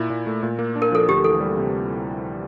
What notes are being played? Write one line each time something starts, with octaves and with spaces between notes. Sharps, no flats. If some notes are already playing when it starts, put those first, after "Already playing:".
Already playing: A#2 E4
A#2
A3
A#2
A#3
D4
A#4
F3 A4
D2 G4
E3 A4
G3
C3